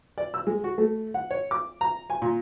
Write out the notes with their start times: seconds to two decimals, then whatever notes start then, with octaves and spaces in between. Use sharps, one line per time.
0.18 D5
0.34 E6
0.47 G#3
0.64 F#4
0.78 A3
1.14 F#5
1.31 C#5
1.51 D6
1.81 A#5
2.10 G#5
2.22 A#2